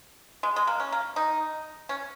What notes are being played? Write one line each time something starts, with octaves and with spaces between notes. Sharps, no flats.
G#3
G#3
A#3
C#4
A#3
D#4
C#4